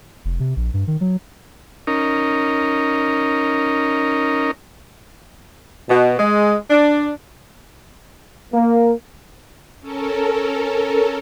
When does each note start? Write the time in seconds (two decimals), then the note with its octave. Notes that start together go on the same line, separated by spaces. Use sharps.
0.25 F1
0.40 C3
0.56 A#1
0.74 G2
0.87 D#3
1.01 F#3
1.87 C#4 D#4 A#4
5.89 B2
6.18 G#3
6.70 D4
8.53 A#3
9.80 C#4 A4 A#4